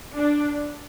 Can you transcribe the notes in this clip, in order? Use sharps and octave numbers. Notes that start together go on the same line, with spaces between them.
D4